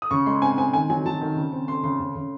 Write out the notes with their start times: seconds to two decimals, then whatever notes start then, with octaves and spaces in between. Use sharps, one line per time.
0.02 D#6
0.11 C#3 C#6
0.26 G#3 C6
0.42 C4 G#5
0.58 C4 G#5
0.73 D#3 G#5
0.89 F#3 G#5
1.06 F#3 A5
1.21 D#3
1.36 C#3
1.52 C4
1.68 C4 C6
1.83 C#3 C6
2.00 C#3
2.15 C#3